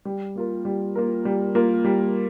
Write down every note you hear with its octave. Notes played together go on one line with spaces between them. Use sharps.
G3
A#3 F4 A#4
G3
A#3 F4 A#4
G3
A#3 F4 A#4
G3